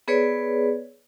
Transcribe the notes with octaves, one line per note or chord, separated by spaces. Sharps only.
B3 G#4 B4 C#5 D5